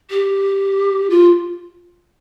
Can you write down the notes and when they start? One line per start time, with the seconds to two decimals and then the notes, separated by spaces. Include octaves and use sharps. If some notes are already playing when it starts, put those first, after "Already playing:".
0.10 G4
1.10 F4